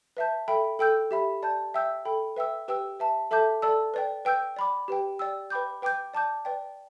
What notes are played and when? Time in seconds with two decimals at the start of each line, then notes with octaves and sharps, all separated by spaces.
0.17 B4 E5 A5 G6
0.48 A4 E5 G5 B5
0.79 A4 G5 E6 G6
1.11 G4 E5 B5
1.43 D5 A5 G6
1.74 E5 G5 E6 G6
2.05 A4 G5 B5
2.36 B4 E5 G5 E6
2.68 G4 B4 G5 E6
2.99 B4 E5 A5
3.31 A4 E5 A5 D6 G6
3.62 A4 D5 A5 E6
3.94 B4 D5 G5
4.25 B4 G5 E6 G6
4.56 D5 B5 D6
4.88 G4 B4 G5
5.19 D5 G5 E6
5.50 B4 G5 B5 D6 G6
5.82 B4 G5 D6 G6
6.14 D5 A5 D6 G6
6.45 B4 D5 G5